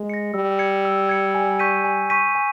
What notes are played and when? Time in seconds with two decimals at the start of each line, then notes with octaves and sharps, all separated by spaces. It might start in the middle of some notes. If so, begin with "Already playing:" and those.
Already playing: G#3
0.10 A#6 C#7
0.34 G3 E6
0.59 G#6 C#7
0.85 E6
1.09 G#6 C#7
1.35 G#5
1.59 C#6 G6 B6 D#7
1.84 G#5
2.10 C#6 G6 B6 D#7
2.35 G#5